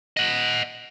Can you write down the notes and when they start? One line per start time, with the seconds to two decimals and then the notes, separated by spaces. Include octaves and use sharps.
0.17 D#5 F#5